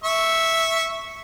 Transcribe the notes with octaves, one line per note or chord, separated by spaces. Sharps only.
E5 C#6